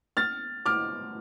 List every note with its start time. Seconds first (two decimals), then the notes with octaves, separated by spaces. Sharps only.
0.17 F6 A6
0.66 D6 F6